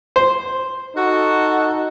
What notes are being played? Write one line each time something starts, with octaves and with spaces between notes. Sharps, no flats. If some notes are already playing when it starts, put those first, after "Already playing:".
C5
D#4 F#4 A4